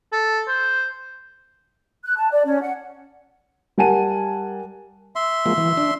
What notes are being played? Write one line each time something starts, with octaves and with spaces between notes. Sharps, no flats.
A4
C5
F#6
A5
D5
C#4
F#5
G3 A#4 F#5 G#5 A5 D#7
E5 C6
F3 G#3 A#3
E3
D4